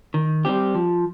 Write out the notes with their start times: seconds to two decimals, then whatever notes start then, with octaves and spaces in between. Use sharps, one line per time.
0.14 D#3
0.45 G3 C4 G4
0.74 F3